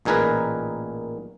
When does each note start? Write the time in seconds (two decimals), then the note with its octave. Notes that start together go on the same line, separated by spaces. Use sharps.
0.05 A1 A#2 D#4 G#4 A#4 B4